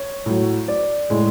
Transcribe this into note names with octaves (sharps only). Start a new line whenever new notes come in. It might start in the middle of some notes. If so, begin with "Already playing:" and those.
Already playing: C#5
A2 F#3
D5
A2 G#3